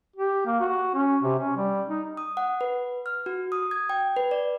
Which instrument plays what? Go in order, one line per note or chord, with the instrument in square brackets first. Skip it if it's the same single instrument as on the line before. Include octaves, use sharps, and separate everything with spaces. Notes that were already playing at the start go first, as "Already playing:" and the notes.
[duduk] G4
A#3
F#4
C#4
C3
C#4
G3
D#4
[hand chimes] D#6
F#5
B4
F6
F#4
D#6
G#6
G5
B4
D5